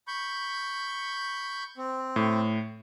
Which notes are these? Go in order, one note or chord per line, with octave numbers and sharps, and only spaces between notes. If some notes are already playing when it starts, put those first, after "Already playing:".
B5 C#6 G6
C4
A2